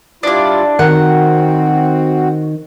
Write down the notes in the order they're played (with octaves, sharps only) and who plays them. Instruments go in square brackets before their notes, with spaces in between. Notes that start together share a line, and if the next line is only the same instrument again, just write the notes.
[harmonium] G3 E4 F4 [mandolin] D4 D5
[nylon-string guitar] D#3 [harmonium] C4 F#4 [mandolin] F#5